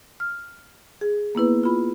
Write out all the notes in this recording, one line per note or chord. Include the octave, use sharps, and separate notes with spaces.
F6
G#4
A#3 B3 E4 B4
F4 B5